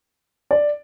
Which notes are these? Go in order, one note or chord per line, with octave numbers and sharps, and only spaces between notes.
D5